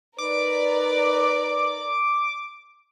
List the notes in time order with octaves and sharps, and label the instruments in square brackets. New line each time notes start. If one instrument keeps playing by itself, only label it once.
[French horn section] D#4 B4 [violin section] A#4 D5 [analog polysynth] D6